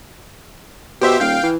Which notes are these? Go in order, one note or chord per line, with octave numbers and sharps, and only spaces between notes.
B2 G4 C5 E5
D#1 F5 G5
E3